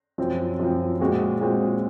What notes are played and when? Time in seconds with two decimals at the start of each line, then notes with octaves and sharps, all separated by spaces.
0.18 F#2 F3 C4
0.59 F#2 F3 C4
1.00 A#2 G#3 C4 F#4
1.41 A#2 G#3 C4 F#4